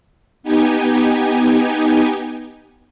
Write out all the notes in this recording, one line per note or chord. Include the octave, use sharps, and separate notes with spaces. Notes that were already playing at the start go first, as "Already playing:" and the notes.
B3 D#4 G4 G#5